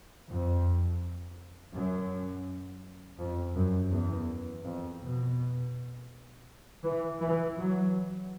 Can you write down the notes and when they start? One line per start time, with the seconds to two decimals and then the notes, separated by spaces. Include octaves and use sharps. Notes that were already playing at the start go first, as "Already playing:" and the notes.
0.28 F2
1.73 F#2
3.19 F2
3.56 F#2
3.92 E2
4.65 F2
5.01 B2
6.83 E3
7.20 E3
7.56 F#3